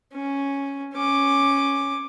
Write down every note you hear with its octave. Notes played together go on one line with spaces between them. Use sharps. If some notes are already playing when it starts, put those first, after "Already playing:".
C#4
C#4 D6